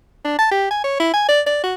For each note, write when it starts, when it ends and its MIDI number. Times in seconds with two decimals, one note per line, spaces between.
0.24 0.34 62
0.39 0.47 81
0.51 0.69 67
0.70 0.80 80
0.84 0.96 73
0.99 1.13 64
1.13 1.26 80
1.28 1.41 74
1.46 1.61 74
1.63 1.75 66